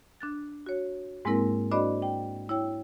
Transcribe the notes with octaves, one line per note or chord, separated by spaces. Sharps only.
D4 F#6 A6
F#4 C#5
G#2 G#3 A#3 C4 E4 A#4
D4 F#4 C5 D5 D#5 B5
G5
E4 C#5 G5 E6